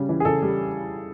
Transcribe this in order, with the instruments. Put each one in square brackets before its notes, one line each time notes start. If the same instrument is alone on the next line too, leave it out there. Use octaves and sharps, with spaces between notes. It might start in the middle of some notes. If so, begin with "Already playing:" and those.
Already playing: [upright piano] C#3 G3
E3
G#4
C#3 A4
G3